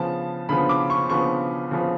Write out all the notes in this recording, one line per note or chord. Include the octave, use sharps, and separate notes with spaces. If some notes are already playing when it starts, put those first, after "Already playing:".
Already playing: C#3 F3 B3 A5
C#3 F3 B3 B5
D6
C#6
C#3 F3 B3 C#6
C#3 F3 B3